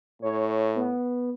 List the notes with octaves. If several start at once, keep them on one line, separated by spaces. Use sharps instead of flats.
A2 C#5
B3